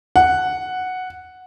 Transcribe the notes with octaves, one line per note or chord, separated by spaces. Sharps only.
F#5